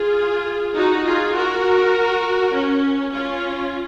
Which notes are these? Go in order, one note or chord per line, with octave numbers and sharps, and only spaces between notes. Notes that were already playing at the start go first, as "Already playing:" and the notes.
Already playing: F4 G#4
D#4 F#4
F4 G#4
F#4 A#4
C#4
C#4 F4